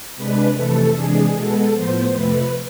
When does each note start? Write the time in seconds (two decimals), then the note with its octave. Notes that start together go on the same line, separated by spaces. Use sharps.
0.16 C3 G#3 D4 B4
0.55 F2 C3 E3 A3 A4
0.94 C3 E3 G#3 D4 G#4
1.33 B2 G#3 B3 A4
1.72 A2 F3 B3 C5
2.11 F2 C3 F3 A3 B4